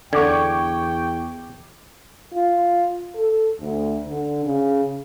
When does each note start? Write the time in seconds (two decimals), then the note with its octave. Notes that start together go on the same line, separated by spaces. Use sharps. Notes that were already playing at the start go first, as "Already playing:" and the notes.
0.13 E2 D3 G5 C#6 D6 G#6
2.33 F4
3.14 A4
3.60 D2
4.07 D3
4.45 C#3